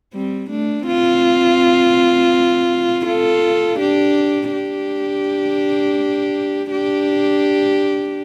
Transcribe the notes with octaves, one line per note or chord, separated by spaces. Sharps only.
G3 C4
A3 D4
C4 F4
F4 A4
D4 G4
D4 G4
D4 G4